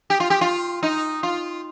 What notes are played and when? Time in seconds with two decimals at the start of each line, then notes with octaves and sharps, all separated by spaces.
0.10 G4
0.20 F4
0.30 G4
0.41 F4
0.83 D#4
1.23 F4